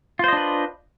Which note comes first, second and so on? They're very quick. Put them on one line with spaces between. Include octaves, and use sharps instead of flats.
F4 C5 D#5 D4 B4